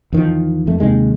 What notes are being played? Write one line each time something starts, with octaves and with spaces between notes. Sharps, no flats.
E2 D#3 F3
F2 A3
D#2 C3 D#3 G#3